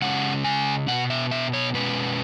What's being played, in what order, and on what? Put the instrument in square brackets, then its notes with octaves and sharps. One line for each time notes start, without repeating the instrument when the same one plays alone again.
[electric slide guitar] C#3 G#3 C#4 F#5
G#5
B2 B3 F#5
E5
E5
C#5
B2 G#3 C#4 B4